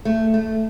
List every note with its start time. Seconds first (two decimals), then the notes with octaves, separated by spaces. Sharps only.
0.05 A3
0.34 A3